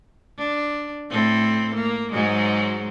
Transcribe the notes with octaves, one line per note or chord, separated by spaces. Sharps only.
D4
A2 C4 A4
A#3
G#2 F#3 G#3